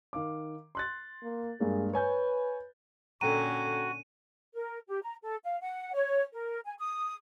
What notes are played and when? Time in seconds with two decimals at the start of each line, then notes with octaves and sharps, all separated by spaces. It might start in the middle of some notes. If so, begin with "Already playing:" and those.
0.13 D#3 F5 D6
0.75 C6 F#6 A6
1.23 A#3
1.60 G2 G#3 A#3 G#4
1.93 B4 C#5 G#5 G6
3.21 A#2 D3 C#4 F#4 A4 G5 A#5 D#7
4.55 A#4
4.88 G4
5.02 A#5
5.22 A4
5.44 F5
5.60 F#5
5.94 C#5
6.32 A#4
6.65 G#5
6.78 D#6